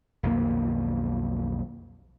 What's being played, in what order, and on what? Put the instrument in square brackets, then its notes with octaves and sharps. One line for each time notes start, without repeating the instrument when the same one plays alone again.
[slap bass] B1 F2 D#3 A#3